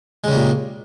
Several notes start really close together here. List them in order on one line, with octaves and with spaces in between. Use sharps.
G#3 C#3 G3 A#2